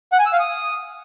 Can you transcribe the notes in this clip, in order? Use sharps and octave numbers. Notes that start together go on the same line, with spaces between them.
F#5
G#5
E6
F5
D#6